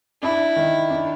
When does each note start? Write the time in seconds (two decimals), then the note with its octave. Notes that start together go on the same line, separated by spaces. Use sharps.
0.22 D4 E4
0.56 D#3
0.90 D4